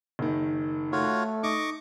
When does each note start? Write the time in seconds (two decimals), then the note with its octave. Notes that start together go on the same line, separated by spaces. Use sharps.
0.19 F#1 D#3
0.92 A3 F4 F#4 C#5
1.43 D#4 D#5 C#6 D6